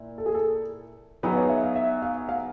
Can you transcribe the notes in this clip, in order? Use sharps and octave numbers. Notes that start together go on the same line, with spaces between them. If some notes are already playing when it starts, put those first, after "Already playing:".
Already playing: A#2 E4
A4
G#4
A4
F#3 B3 D#4 G#4 B4
C#5
E5
F5
E5
F5
F5